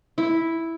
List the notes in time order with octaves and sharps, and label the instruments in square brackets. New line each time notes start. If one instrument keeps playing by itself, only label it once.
[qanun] E4